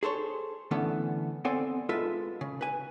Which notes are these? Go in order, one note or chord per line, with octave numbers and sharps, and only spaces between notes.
G#4 A4 C5 C#5
D3 E3 A3 B3 C#4 A4
B3 C4 A4 D5 F5 G#5
G#3 F4 A4 B4 E5
C#3
B4 G#5